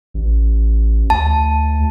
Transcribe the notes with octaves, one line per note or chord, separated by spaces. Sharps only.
A1
D2 A5